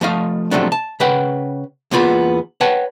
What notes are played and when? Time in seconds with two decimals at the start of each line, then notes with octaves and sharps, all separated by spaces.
0.01 F3 A3 D#5 F5
0.51 C3 D#3 F3 F#3 A3 D4
0.72 A5
1.00 C#3 B4 F#5 G5
1.91 E2 A#3 B3 F4 B5
2.61 B4 C#5 F#5 G5 A5